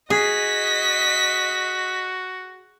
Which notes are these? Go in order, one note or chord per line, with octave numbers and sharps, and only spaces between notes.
F#4 G#4 D#5 B6